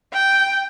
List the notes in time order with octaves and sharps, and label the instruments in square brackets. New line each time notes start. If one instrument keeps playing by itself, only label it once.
[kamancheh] G5